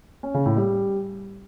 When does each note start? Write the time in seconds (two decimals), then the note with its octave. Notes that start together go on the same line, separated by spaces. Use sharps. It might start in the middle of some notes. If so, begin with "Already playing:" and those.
0.23 C#4
0.34 C#3
0.46 A2
0.57 G3